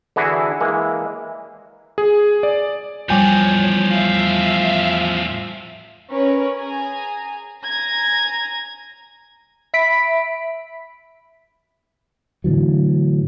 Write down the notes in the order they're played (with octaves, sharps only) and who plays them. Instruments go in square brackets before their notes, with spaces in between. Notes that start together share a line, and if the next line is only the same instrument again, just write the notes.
[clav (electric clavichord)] D3 E3 E4 F#4 G#4
E3 G#3 A#3
[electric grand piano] G#4
D5
[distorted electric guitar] E2 A2 [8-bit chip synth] F3 [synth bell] G3 G#5 G6 [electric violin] C#5
[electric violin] E5 F5
[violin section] C#4 A#4 B4 C#5
G#4 G#5 A#5
G#5 A#5 G#6 A#6
[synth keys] E5 B5 B6 D7
[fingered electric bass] A2 D3 E3 F#3